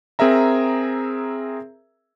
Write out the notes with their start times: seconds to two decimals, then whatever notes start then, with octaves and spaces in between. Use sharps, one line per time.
0.19 C4 G#4 A#4 E5 A#5